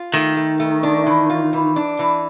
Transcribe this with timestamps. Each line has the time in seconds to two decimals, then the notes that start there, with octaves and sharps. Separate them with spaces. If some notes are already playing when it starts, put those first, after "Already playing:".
Already playing: F4
0.13 D#3 A3
0.37 A3
0.60 A3
0.83 D4
1.06 E3
1.30 F4
1.53 E3
1.76 D4
1.99 E3